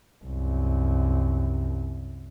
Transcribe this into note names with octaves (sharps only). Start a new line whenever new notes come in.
C2 F#2